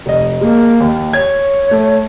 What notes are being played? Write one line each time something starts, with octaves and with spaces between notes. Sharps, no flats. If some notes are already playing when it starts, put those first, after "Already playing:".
F1 D#5
G#3 A#3
D#2
C#5 G#6
A3